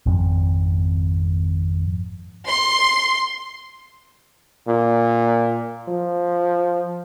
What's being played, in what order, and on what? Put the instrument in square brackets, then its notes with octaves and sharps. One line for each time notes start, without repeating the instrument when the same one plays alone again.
[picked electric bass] G#1 F2
[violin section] C6
[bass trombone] A#2
F3